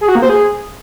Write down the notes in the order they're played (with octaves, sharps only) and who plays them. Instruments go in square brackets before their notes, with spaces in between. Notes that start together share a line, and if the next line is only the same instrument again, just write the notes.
[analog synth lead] G#4
F#4
A#3
C5
G#4